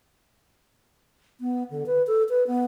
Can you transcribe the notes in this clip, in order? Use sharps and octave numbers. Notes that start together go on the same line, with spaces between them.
B3
D3
B4
A4
B4
B3